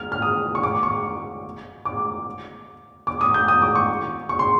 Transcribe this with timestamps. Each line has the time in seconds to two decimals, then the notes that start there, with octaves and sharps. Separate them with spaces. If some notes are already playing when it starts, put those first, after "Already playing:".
Already playing: F6
0.12 F6
0.22 D#6
0.55 C#6
0.63 D6
0.83 C#6
1.85 D6
3.07 D6
3.21 D#6
3.34 G6
3.48 D#6
3.62 D6
3.75 C#6
4.29 C#6
4.39 C6